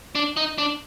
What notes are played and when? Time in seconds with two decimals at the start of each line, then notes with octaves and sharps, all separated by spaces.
0.15 D4
0.37 D#4
0.58 D4